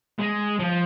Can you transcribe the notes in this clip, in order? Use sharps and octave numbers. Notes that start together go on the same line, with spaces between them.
G#3
F3